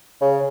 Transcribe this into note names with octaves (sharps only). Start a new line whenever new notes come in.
C#3